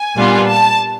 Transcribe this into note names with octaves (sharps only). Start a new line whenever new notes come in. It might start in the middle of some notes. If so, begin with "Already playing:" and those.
Already playing: G#5
A#2 G3 B3 D4 F4
A5